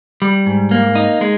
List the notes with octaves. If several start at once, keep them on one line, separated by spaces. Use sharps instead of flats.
G3
G#2
A#3
D#4
G#3